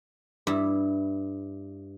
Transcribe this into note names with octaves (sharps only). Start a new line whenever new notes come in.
G2 E4